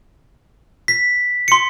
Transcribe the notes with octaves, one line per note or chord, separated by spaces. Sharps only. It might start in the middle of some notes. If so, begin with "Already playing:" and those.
B6
C6 C#7